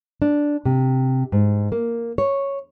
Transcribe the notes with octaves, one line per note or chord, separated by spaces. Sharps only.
D4
C3
G#2
A#3
C#5